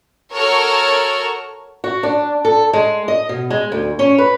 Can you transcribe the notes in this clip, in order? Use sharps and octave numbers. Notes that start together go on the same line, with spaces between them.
F#4 A4 A#4 C#5 C#6 F6
F#4
D4
A4
G#3
D#5
B2
G#3
D2
C#4
B4